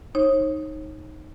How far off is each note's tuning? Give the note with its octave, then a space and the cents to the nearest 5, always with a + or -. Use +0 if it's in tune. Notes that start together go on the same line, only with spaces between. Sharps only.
D#4 +0 C#5 -40